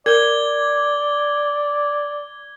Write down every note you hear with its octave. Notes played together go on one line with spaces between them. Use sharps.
A#4 D5 G#6 G7